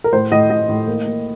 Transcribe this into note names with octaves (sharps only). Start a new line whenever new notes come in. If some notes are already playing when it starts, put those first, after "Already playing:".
A#4
A2 C5
A2 D#5
A2 D#5
A2
A#3
A#3